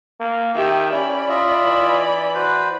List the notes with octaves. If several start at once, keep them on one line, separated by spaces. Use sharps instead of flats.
A#3
D#3 G4 E5
C#4 E4 D5 B5
F4 D#5 E5
E3
F#4 B4 C5